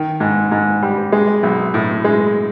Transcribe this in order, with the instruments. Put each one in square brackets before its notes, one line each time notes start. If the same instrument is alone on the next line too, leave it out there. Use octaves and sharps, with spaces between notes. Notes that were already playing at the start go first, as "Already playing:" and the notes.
Already playing: [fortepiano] D#3
G#2
G#2
G3
G#3
B1
A2
G#3